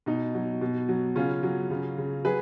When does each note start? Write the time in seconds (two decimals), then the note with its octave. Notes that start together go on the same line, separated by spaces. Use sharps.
0.06 B2 D#4
0.35 F#3
0.61 B2
0.89 F#3
1.15 C#3 C#4 F4
1.43 F#3
1.71 C#3
1.98 C#3
2.24 F#3 G#4 B4